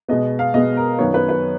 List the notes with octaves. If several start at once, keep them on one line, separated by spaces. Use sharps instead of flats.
B2 G#3 B3 D#5
F5
B2 G#3 B3 D#5
A#4
F#2 D#3 F#3 B3 C#5
B4
B4